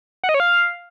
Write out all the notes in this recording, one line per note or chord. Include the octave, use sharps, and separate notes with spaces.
F#5
D#5
C#5
F5